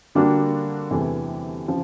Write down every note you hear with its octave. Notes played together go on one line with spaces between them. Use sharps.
D3 G3 A#3 D4 F#4
E2 C3 E3 A3
C#3 F3